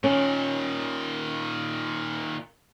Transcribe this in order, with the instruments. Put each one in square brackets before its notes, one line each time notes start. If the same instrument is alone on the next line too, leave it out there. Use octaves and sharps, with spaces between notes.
[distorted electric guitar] A#2 D#3 [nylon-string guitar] C#4